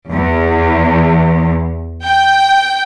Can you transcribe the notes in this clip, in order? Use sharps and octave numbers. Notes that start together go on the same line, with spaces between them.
E2
G5